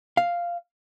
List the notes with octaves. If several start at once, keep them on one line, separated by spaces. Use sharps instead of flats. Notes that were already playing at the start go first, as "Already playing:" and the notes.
F5